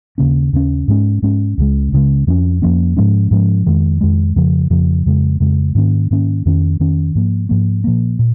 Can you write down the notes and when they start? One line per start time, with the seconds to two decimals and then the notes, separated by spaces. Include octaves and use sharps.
0.18 D#2 C#3 A#3 C#4
0.53 D#2 C#3 A#3 C#4
0.88 G#2 G#3 C#4
1.22 G#2 G#3 C#4
1.58 C#2 C#3 G#3
1.92 C#2 C#3 G#3
2.27 F2 F3 A#3 C#4
2.62 F2 F3 A#3 C#4
2.97 G#2 F3 G#3 C#4
3.31 G#2 F3 G#3 C#4
3.66 F2 D#3 G#3
4.01 F2 D#3 G#3
4.36 F2 C#3 F3
4.70 F2 C#3 F3
5.06 F2 C#3 G#3
5.40 F2 C#3 G#3
5.75 G#2 D#3 A#3 C#4
6.11 G#2 D#3 A#3 C#4
6.46 F2 D#3 C#4
6.80 F2 D#3 C#4
7.15 G#2 F3 A#3
7.49 G#2 F3 A#3
7.84 A#2 F3 A#3
8.19 A#2